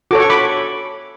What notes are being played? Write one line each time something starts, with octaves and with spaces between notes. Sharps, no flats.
F#4 A4 C#5 D6
C#6
B5 D6